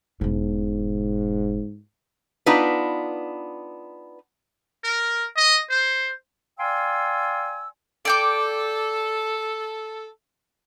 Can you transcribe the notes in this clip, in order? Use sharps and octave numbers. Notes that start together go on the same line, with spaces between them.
E1 G#2 B2
B3 D4 D#4 F4 B4
A#4
D#5
C5
D5 F5 G5 G#5 C6 E6
A4 D5 G5 D6